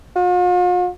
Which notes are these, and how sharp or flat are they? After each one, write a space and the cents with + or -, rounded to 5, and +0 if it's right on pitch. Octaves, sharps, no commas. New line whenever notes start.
F4 +45